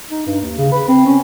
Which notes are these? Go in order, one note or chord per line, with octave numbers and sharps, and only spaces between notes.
D#4
G2
D#2
C#3
B4
C4
C#4